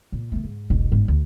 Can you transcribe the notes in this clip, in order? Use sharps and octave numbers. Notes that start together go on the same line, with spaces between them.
A#2
D#3 A3
G#2
E1 B1
G1 G#2
D2